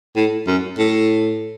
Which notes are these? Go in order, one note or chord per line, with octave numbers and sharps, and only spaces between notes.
A2
F#2
A2